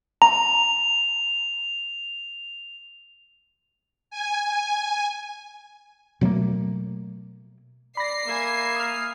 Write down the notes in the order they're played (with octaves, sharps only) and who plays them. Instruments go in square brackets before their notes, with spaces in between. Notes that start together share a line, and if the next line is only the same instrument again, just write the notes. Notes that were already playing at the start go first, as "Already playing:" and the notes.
[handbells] A#5 [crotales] F7
[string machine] G#5
[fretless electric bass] B2 F#3 A3 A#3
[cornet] D5 [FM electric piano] B5 A#6 [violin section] C7
[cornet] A#3 [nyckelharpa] E5 G#5
[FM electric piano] D#6 F6